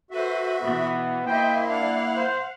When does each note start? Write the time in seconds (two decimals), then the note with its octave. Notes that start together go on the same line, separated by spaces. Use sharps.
0.11 F#4 A4 B4 C5 E5
0.61 B2 E3 B3
1.27 A#3 E4 C5 D#5 E5 G5
1.68 D4 F5 F#5
2.17 C5